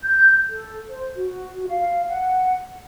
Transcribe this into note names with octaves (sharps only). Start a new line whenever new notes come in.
G6
A4
C5
F#4
F#4
F5
F#5